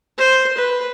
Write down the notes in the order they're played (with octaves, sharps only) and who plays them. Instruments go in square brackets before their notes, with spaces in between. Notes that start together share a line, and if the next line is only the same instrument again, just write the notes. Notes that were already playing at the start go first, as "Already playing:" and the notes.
[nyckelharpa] C5
B4